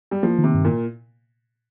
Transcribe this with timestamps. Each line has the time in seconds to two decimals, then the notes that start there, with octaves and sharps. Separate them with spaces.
0.11 G3
0.23 F3 A#3
0.38 D#3
0.43 C3
0.54 G2
0.65 A#2